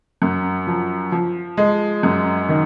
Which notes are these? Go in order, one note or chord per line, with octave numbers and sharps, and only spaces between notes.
F#2
F3
F3
G#3
F#2
D#3